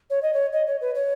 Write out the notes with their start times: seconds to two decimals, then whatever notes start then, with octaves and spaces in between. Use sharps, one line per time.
0.10 C#5
0.22 D#5
0.33 C#5
0.52 D#5
0.66 C#5
0.81 B4
0.95 C#5